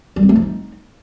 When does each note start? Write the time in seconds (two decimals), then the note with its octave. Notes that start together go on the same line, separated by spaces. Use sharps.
0.16 G3
0.23 C4
0.29 A3
0.36 F3
0.42 D#4